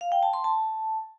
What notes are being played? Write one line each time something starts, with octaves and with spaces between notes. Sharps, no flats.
F5
G5
A5
C6
A5